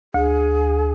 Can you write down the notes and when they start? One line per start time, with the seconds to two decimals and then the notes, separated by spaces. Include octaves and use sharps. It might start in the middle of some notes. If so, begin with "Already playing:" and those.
0.14 D2 G#4